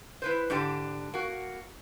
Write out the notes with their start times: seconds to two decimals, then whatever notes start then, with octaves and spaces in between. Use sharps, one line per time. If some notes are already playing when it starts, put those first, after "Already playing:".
0.22 E4 B4 C5
0.50 G#2 D3 D4 G4
1.14 A#3 F#4